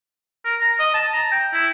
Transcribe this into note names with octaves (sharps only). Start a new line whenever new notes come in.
A#4
A#5
D#5
A5
A#5
G5
E4